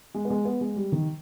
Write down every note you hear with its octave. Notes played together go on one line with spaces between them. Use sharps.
G#3
B3
G#3
B3
G#3
G3
D#3